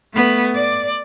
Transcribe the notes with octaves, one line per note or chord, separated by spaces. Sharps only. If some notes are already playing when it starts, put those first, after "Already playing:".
A3 B3
D5